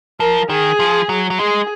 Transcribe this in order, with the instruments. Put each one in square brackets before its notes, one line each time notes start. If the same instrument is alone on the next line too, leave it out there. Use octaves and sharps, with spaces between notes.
[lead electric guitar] F3 [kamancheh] A#4
[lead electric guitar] D#3 [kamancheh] G#4
[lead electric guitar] F3
F#3
F#3
[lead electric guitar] G#3 [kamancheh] G#4